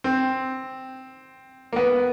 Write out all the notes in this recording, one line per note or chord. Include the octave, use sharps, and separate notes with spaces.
C4
A#3
B3